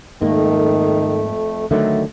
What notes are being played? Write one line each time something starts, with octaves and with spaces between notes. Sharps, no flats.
F2 G#2 D#3 A3 A#3
D3 D#3 F#3 A3